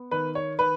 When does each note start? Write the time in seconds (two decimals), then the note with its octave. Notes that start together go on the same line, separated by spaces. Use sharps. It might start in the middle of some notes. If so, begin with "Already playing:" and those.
Already playing: B3
0.11 D#3 B4
0.35 C#5
0.59 D#3 B4